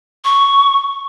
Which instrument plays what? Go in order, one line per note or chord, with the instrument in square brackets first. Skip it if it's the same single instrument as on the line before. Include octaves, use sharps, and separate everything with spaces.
[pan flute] C#6